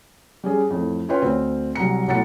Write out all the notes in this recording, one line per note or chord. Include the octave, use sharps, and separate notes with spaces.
G3 C#4 G#4
F2 A2
C#4 F4 B4 C#5 G5 C6
D2 C4
C2 F#3 A#5 C#7
B1 A2 F#5 A#5 A6 C#7